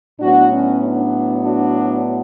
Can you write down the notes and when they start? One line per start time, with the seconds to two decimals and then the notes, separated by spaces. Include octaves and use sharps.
0.20 A2 F#3 B3 D4 F#4
0.51 C#4
0.82 D4
1.43 D4 F#4